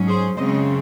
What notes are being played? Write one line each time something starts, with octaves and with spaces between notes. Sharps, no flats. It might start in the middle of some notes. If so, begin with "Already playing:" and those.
Already playing: G#2 F#3 C#4
G#4 C5
F#2 C#3 G#3 C4 C5 D#5